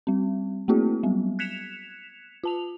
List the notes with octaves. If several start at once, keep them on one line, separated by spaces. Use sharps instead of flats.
G3 C4
A3 A#3 C4 E4 F#4 G#4
F#3 G3 B3
F#6 G#6 B6 C#7 E7 F7
F4 A5 F7